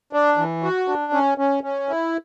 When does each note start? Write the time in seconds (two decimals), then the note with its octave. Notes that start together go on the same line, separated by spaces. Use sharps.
0.13 D4
0.38 E3
0.63 F#4
0.88 D4
1.13 C#4
1.38 C#4
1.64 C#4
1.89 E4